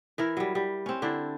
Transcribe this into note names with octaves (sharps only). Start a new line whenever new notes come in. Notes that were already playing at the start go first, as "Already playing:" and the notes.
E3 E4 A#4
F#3 G3
G3
C4 C#4
D3 D4 E4 G5